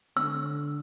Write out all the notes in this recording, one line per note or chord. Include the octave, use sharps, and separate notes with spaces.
D3 E6